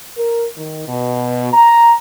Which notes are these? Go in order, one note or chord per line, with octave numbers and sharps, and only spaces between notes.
A#4
D#3
B2
A#5